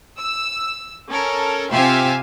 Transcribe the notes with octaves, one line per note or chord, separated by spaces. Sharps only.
E6
C#4 A4 A#4
C3 F4 G4 E5 F5 G#5